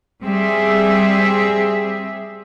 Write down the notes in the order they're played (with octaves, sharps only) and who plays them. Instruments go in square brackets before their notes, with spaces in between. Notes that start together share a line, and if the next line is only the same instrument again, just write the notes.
[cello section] G3 C4 G#4 E5